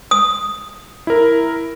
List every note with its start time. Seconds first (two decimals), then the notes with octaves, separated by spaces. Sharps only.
0.11 D#6
1.07 E4 A#4